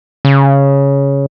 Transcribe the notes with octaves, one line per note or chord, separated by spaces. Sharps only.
C#3